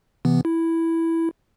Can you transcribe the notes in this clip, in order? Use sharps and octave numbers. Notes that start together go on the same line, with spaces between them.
C3 E3 B3
E4